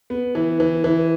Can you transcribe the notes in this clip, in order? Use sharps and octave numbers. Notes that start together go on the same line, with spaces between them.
B3
E3
E3
E3